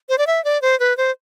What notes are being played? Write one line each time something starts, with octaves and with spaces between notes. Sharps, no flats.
C5
D5
E5
D5
C5
B4
C5